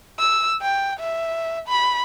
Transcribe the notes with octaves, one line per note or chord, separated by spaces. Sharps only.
E6
G5
E5
B5